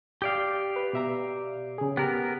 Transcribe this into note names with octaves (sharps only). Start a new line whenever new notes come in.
G4 D5 F5 G5 D#6
B4
B2 E5 A#5
C#3 G#4
B3 G4 A#4 F#6